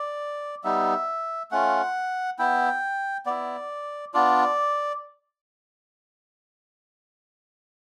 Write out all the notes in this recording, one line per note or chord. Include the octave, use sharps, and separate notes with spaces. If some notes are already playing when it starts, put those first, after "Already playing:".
Already playing: D5
G3 B3 D#4 E5
A3 C#4 F4 F#5
B3 E4 G5
B3 E4 D5
B3 D4 F4 D5